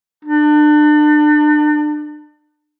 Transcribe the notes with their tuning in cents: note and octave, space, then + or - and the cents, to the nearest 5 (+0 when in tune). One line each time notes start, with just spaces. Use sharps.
D4 +35